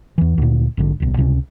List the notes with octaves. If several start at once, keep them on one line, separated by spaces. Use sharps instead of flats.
E2 E3
D2 A#2
A#1 G#2 D3
D1 B1
C#2 C3 G#3 C#4